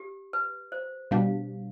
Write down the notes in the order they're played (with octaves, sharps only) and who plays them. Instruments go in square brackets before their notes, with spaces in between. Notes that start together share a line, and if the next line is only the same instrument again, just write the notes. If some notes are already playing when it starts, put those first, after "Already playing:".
Already playing: [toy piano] G4
B4
C5
[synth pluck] B2 G3 D4 [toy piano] F5